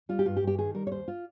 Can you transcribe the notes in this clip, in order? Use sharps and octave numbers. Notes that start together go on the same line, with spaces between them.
G3 F4
G4
G2 F4
G4
G2
G4
D#3 G#4
G3 A#4
C#5
D#2 C5
F4